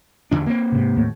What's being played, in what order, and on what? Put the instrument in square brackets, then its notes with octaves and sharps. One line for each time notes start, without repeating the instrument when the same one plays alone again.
[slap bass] E2 D3 D4
A#3 C4
[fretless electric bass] G#2 C3
D#2 A2